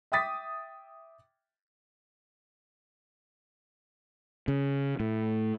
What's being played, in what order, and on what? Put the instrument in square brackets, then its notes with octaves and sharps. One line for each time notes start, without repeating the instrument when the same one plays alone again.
[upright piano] E5 G5 D6 D#6 A6 B6
[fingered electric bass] C#3
A2